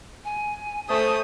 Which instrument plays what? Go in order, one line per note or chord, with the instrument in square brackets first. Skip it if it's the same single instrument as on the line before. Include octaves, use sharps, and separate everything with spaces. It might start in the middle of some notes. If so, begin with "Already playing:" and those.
[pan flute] G#5
[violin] A3 D#6 [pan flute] C5